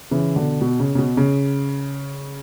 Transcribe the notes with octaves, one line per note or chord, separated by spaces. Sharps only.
C#3 E3
B2 D3
B2
C#3
C#3
B2
C#3